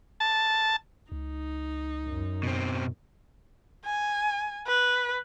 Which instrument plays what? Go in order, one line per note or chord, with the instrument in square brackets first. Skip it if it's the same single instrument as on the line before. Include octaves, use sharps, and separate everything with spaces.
[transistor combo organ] A5
[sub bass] C#2 [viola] D#4
[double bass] F#2
[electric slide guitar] B2 C4
[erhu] G#5
B4